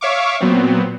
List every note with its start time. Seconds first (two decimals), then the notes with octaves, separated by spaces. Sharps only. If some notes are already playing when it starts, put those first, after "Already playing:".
0.01 C#5 E5 F5 C#6 D6
0.40 A#2 F#3 B3 C4